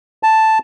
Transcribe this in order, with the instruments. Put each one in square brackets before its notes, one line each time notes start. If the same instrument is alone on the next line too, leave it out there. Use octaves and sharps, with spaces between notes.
[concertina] A5